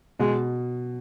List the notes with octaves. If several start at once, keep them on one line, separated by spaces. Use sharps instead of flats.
B2 G#3